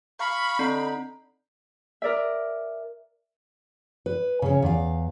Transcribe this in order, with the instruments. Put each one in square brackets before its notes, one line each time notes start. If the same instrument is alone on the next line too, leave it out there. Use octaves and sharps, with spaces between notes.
[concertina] F5 C#6 [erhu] B5
[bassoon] D3 [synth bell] C4 [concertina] D#4
[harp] A#4 D5 E5
[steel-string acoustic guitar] B4
C#3 C#4
E2 F5